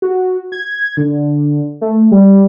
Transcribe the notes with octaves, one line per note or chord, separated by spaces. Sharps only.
F#4
G#6
D3
A3
G3